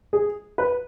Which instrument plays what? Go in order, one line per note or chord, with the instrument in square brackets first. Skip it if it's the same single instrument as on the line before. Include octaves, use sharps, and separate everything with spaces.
[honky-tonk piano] G#4
B4